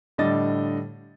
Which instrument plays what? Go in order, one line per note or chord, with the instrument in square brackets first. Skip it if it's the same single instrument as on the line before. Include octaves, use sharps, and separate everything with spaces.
[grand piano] A2 D3 G3 D#5 A6